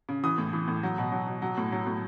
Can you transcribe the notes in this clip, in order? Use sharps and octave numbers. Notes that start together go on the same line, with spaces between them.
C#3
E3 D#6
A2
E3
A2
F#3
B2
F#3
B2
F#3
A2
F#3
A2